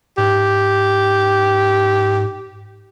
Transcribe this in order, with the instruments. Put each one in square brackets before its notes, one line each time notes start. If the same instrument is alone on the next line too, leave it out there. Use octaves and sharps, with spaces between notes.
[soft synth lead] G#2 [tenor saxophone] G4